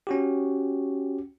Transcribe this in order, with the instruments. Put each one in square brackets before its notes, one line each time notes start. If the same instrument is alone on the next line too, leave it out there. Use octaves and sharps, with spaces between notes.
[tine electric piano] C#4 F#4 G4